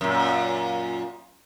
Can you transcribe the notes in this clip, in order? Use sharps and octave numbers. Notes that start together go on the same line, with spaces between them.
F#2 A#2